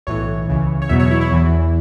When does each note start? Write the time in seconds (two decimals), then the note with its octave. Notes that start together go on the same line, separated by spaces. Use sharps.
0.07 B1 A2 E3 C#5
0.48 C#2 C#3 E3
0.82 C#5
0.89 E2 B2 F#3 E5
1.00 C#5
1.11 E4
1.21 E4
1.31 E2 E3